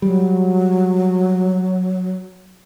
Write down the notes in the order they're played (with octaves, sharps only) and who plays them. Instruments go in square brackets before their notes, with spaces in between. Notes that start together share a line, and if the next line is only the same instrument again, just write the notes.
[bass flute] F#3 [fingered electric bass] G3